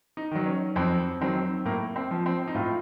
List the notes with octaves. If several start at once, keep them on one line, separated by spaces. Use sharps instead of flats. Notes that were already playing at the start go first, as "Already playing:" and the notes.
D#4
D#3 F#3
C#4
F2 C4
D#3 F#3 C4
A2 A#3
C4
F3
C4
D#4
A2 F4